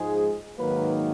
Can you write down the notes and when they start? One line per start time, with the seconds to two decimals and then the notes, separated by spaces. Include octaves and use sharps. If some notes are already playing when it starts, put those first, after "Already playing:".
Already playing: G#2 F3 G#3 G#4
0.58 G#2 D#3 F#3 A#3 B4